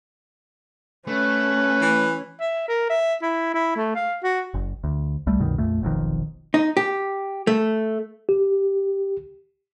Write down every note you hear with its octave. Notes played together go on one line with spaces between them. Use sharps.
A3 C#4 B4
E3
E5
A#4
E5
E4
E4
A3
F5
F#4
F#1
D2
C2 G3 A3
C2 F#2 B2 D#3
A#1 F2 A3
F1 B1 F2 D#3
D#4
G4
A3
G4